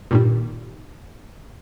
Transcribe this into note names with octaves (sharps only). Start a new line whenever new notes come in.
G2 A#2 D#3 G3